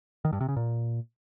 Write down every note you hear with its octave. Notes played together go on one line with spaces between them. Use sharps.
D#3
G2
C3
C#3
A#2